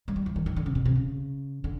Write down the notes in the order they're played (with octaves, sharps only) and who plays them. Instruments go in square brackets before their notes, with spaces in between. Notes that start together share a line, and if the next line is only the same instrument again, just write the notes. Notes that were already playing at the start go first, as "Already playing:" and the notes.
[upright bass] G#3
G3
E3
D#3
D#3
D3
C#3
B2
C3
C#3
D3